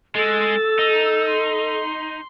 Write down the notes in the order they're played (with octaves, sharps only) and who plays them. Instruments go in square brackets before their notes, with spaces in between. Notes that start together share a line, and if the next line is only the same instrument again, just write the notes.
[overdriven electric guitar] G#3 [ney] A4 [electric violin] E6 A6
[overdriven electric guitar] D#4
[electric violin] C6